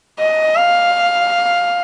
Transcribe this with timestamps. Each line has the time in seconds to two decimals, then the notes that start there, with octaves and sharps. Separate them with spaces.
0.19 D#5
0.56 F5